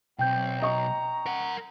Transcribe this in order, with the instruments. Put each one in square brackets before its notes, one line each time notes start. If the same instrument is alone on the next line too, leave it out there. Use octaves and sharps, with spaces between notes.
[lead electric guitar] B1 [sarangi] C4 [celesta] G5 G6
[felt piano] D#5 C#6 [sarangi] A#5
[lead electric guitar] A#4 F#5